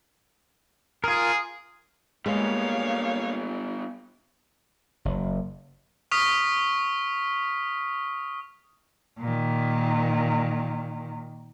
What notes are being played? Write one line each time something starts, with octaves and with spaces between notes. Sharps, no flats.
F4 G#4 A#4
G3 G#3 A#3 B3 C#5 F5
F#1
C#6 D#6 F6 B6
A#2 D#3